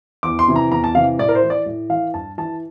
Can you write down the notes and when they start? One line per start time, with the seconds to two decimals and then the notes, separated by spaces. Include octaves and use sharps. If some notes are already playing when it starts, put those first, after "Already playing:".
0.23 E2 D6
0.39 C6
0.48 C3 E3
0.56 A#5
0.71 E2 A#5
0.84 A5
0.95 C3 E3 F5
1.19 A2 D5
1.29 A#4
1.35 C5
1.43 E3
1.50 D5
1.66 A2
1.90 E3 F5
2.14 G2 A5
2.38 E3 A5